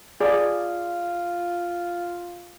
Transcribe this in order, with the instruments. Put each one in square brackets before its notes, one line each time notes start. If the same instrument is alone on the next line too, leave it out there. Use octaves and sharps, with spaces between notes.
[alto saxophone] F4 [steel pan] G#4 D5